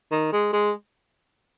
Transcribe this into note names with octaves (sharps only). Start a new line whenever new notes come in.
D#3
G#3
G#3